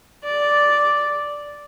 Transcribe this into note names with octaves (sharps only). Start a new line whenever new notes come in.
D5